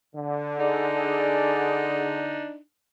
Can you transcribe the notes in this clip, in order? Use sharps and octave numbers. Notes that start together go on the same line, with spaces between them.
D3
D4 D#4 G#4 D5